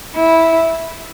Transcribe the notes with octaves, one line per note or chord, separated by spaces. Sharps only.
E4